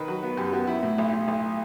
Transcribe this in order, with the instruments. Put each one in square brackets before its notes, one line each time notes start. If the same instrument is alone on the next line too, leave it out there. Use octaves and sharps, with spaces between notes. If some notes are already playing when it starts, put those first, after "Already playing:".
Already playing: [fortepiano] D#3 B4
F#3
B3
F#2 G4
B3 F#4
F#3 E4
A2
B1
B1
B1